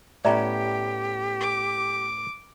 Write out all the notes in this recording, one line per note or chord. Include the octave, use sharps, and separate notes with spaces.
A2 B3 C#4 G4 D5 E5 A#5
D6